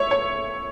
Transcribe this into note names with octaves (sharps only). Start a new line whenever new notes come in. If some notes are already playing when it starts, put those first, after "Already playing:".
Already playing: C#5 E5
C#5